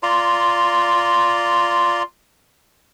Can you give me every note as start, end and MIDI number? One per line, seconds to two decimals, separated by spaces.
0.03 2.03 65
0.03 2.03 74
0.03 2.03 82
0.03 2.03 84